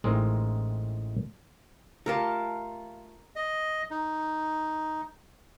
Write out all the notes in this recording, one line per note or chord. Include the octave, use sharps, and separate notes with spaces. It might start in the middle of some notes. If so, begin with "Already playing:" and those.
A1 A2 G#3 C4 D#4 A#4
A3 F4 G4 A#4 F5 A5
D#5
D#4